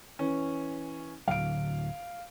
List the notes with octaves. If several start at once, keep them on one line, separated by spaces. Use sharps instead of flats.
E3 C#4
D1 D3 F#3 F5 D7